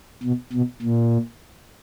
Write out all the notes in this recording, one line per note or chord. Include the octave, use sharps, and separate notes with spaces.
B2
B2
A#2